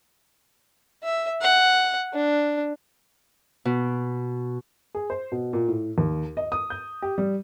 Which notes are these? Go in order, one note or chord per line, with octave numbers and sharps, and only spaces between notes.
E5
F#5
D4
B2
G#4
C5
B2
A#2
A2
D#2
D#5
D#6
G6
G4
G3